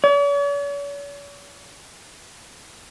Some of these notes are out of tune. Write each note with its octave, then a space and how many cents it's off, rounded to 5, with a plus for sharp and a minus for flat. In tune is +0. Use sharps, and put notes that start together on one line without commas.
C#5 +45